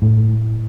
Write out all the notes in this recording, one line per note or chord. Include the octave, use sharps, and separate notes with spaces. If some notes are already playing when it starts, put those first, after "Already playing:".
A2